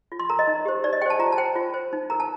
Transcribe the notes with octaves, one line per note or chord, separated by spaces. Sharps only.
F4
C6
A#4 A#5
D#5
D#4
G4 C5
D#4 D5
D#5
G4 C5 G5 A5
F4 A#5
A5
C5 G5
F4
C5
D#4
A#4 A#5
A5